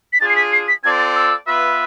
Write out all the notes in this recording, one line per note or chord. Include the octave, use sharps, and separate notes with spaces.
B6
D4 F4 G#4 A6
C7
B6
C7
B6
C4 F4 A4 D5 G#6
A6
E6
B3 F4 B4 E5